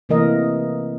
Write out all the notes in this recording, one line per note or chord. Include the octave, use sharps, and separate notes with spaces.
C3 E3 A3 A#3 A#4 D#5